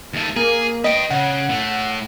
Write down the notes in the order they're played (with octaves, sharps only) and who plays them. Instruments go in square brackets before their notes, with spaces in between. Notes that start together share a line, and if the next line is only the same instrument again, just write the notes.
[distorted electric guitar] D#2 A3
[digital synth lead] A#3 [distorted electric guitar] G#4
[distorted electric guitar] B4 G5 [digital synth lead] D#5
[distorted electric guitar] C#3 [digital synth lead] F#5
[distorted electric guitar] A2 A3